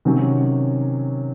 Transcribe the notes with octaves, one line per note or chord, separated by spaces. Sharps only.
C3 D#3 F#3 C#4